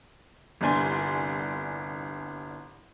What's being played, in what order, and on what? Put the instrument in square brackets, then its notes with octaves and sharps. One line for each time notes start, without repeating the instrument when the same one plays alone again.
[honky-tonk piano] G1 C2 D4 G#5 C6